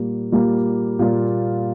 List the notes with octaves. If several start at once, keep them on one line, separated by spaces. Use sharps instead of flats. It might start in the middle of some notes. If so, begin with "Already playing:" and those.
Already playing: A#2 G3 A#3 F4
A#2 G3 A#3 F4
A#2 G3 A#3 F4